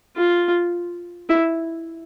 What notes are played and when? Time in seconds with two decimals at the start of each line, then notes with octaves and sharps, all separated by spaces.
0.16 F4
1.29 E4